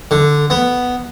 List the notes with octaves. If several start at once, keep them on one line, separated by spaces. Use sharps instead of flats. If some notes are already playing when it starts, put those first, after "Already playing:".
D3
B3